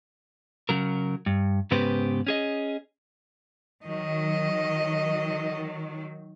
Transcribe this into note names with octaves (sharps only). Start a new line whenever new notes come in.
C#3 F#3 A#4
G2
G#2 C#3 B3 G4 B4 C5
C#4 G#4 D#5
D#3 F#3 D#5